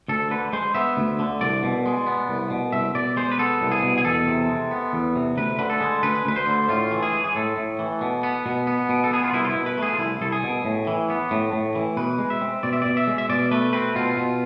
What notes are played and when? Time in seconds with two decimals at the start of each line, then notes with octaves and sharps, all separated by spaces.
0.08 D2 A4
0.31 D3 B4
0.53 G#3 C5
0.75 B3 E5
0.97 D2
1.19 D3
1.41 C2 D5
1.63 B2
1.86 G#3
2.06 B3
2.29 C2
2.50 B2
2.73 C2 E5
2.95 B2 D5
3.17 G#3 C5
3.31 B4
3.39 B3 A4
3.61 C2
3.72 G#4
3.83 B2
3.98 G#4
4.05 E2 A4
4.28 C3
4.49 G#3
4.71 B3
4.93 E2
5.16 C3
5.37 D2 B4
5.59 D3 B4
5.70 A4
5.81 G#3
6.03 D2 B4
6.26 D2 B4
6.36 C5
6.47 D3
6.69 A2 F4
6.91 E3
7.03 G#4
7.13 G#3
7.24 G#4
7.35 A2 A4
7.57 A2
7.79 E3
8.01 B2
8.23 B3
8.46 B2
8.67 B3
8.89 B2
9.04 A4
9.11 B3 G#4
9.24 F4
9.33 C2 E4
9.45 F4
9.50 E4
9.55 B2
9.66 B4
9.77 A3 G#4
9.93 F4
9.99 C2 E4
10.21 C2 A4
10.32 G#4
10.43 B2
10.65 A2
10.87 E3
11.10 B3
11.31 A2
11.53 A2
11.75 E3
11.97 B2 B4
12.19 G#3
12.30 E5
12.41 C4
12.63 B2 D5
12.73 E5
12.82 B2 D5
12.97 E5
13.07 G#3
13.18 E5
13.29 B2 D5
13.51 A3 B4
13.73 C4 B4
13.95 B2 F4
14.17 B2